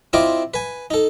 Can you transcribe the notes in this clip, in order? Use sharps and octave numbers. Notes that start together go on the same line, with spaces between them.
C4 E4 F4 D5 D#5
B4 G#5
D#4 A4